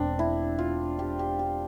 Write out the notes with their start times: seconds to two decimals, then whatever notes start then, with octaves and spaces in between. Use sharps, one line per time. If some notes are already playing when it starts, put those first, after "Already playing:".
Already playing: E1 C4 D4
0.19 E4
0.59 F4
0.99 G4
1.19 G4
1.39 G4